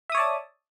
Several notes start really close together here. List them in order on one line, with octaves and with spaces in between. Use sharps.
E5 D#6 C#5 D5 A5